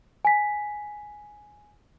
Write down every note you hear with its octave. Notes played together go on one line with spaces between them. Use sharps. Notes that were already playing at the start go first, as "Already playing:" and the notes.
G#5 B6